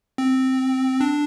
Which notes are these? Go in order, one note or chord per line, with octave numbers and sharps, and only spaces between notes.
C4
D4